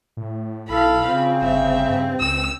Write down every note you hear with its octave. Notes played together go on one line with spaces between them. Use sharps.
A2
B1 E4 A4 F5 B5
C#3 C4 F4
G1 E5
G2
C#2 E6